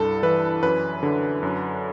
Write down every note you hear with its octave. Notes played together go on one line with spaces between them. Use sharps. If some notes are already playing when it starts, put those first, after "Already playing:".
Already playing: C2 G2 A4
E3 B4
F#2 B4
D3
F#2